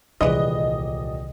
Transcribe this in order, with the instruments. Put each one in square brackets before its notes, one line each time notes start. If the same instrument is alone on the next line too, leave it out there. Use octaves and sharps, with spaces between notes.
[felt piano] D#1 D5 [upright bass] C2 [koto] E3 G#3 B4 [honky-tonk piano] D#5